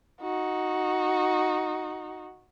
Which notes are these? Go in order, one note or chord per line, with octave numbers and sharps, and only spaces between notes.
D#4 F#4